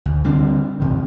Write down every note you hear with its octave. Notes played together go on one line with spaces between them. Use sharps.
D2
D3 G3 C4 D4
E2 C3 D#3